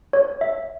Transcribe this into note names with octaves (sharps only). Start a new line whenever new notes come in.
C#5
E5